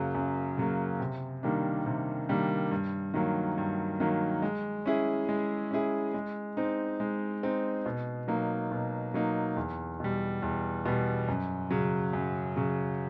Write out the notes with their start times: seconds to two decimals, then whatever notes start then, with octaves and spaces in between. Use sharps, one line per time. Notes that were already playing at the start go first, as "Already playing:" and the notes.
Already playing: F#2 C#3 F#3 A#3
0.15 F#2
0.58 C#3 F#3 A#3
1.00 C3
1.43 D#3 G3 A#3 D4
1.86 C3
2.29 D#3 G3 A#3 D4
2.71 G2
3.14 D#3 F#3 A#3
3.58 G2
4.00 D#3 F#3 A#3
4.42 G#3
4.86 C#4 E4 G#4
5.29 G#3
5.71 C#4 E4 G#4
6.14 G#3
6.57 C4 D#4
7.00 G#3
7.43 C4 D#4
7.85 B2
8.28 F#3 A#3 D#4
8.71 B2
9.14 F#3 A#3 D#4
9.57 E2
10.00 B2 G3
10.42 E2
10.85 B2 G3
11.28 F#2
11.71 C#3 F#3
12.13 F#2
12.57 C#3 F#3